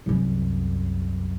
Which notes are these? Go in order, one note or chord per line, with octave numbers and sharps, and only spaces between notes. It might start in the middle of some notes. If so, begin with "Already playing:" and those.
C2 F#2